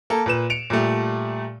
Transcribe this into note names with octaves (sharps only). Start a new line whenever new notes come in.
A#3 A4
A#2 B4 E7
C#7 D7 F7
A#2 G3 A3